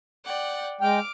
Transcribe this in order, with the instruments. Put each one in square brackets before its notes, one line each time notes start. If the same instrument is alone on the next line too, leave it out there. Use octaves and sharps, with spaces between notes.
[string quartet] D5 F#5 G5
[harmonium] G#3 G5 [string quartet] D6 F6